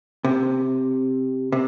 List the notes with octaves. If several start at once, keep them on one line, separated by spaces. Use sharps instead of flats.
C3
C3